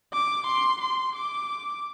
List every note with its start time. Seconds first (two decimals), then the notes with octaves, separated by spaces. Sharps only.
0.14 D6
0.47 C6
0.82 C6
1.16 D6